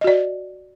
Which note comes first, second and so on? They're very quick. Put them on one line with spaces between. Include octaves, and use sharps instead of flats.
D#5 F#4 D5